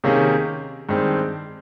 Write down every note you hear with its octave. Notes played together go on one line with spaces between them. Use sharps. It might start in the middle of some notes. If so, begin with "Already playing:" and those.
C3 D#3 A#3 C#4 G#4
G2 D#3 G#3 C4